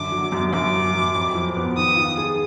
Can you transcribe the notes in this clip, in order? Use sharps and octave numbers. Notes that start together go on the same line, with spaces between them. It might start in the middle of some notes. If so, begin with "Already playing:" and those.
Already playing: F#2 D3 D6
F#3
F#2
F#2 D6
F#3
F#2
F2
F3
B3
D#3 D#6
F4
G#4